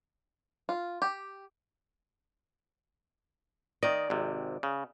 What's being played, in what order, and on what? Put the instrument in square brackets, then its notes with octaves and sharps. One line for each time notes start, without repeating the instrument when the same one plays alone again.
[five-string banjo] F4
G4
[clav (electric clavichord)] D#3 D#5 [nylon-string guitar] D5
[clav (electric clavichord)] G#1 C3
C#3